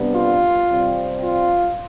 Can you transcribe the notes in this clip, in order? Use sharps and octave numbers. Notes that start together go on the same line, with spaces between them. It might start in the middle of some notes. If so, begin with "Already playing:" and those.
Already playing: C3 G3 B3 D4
F4
C3 G3 C4
F4